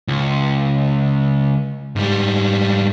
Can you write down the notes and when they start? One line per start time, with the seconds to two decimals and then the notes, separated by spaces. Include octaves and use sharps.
0.08 C#2
1.96 G#2 G3